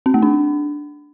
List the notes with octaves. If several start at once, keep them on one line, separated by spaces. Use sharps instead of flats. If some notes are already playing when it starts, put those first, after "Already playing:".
C4
A3
D4